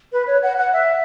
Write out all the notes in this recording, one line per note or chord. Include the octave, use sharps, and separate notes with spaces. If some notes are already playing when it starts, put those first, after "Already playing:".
B4
C#5
F#5
F#5
E5